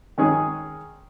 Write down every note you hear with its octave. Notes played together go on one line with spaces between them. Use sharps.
D#3 G#3 C#4 G#4